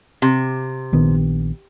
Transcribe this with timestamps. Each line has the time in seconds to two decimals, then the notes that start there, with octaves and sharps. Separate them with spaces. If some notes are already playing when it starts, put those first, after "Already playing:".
0.22 C3
0.93 A#1 D#3 B3